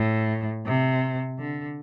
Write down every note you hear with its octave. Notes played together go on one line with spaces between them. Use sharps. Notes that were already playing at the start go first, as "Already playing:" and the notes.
Already playing: A2
C3
D3